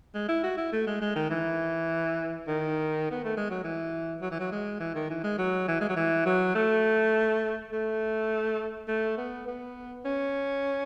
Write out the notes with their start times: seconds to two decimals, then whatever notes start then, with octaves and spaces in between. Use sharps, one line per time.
0.15 G#3
0.29 E4
0.43 F#4
0.57 E4
0.72 A3
0.87 G#3
1.01 G#3
1.15 D#3
1.31 E3
2.47 D#3
3.11 B3
3.24 A3
3.37 G#3
3.50 F#3
3.64 E3
4.21 F#3
4.31 E3
4.40 F#3
4.52 G#3
4.80 E3
4.95 D#3
5.10 E3
5.24 G#3
5.39 F#3
5.68 E3
5.81 G#3
5.89 F#3
5.96 E3
6.26 F#3
6.55 A3
7.72 A3
8.88 A3
9.18 B3
9.47 B3
10.05 C#4